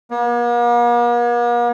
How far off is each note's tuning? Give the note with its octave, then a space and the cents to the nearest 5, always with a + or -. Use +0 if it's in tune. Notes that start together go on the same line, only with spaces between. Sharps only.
A#3 +45